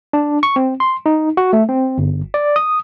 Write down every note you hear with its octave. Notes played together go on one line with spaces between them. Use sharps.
D4
C#6
C4
C6
D#4
F#4
A3
C4
G1
D5
D#6